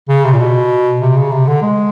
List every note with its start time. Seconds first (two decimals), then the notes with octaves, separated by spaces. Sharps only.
0.09 C#3
0.25 C3
0.33 A#2
0.40 B2
1.01 C3
1.16 C#3
1.32 C3
1.47 D3
1.62 G#3